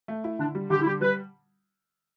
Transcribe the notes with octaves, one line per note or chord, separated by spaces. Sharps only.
A3
E4
D3 D4
G3
D3 G4
E4
G3 G4
G3 B4